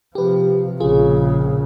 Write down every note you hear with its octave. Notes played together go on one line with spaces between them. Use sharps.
C3 F3 G4 B4
A#1 C#3 F4 G#4